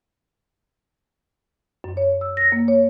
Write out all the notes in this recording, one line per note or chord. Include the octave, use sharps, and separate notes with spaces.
F#2
C#5
E6
A#6
A#3
C#5